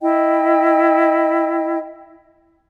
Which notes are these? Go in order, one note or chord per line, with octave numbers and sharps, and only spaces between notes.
E4 D#5 G5